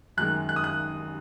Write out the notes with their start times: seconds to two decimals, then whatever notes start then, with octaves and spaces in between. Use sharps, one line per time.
0.17 F#2 D#3 G#3 F#6
0.49 F#6
0.56 D#6
0.64 F#6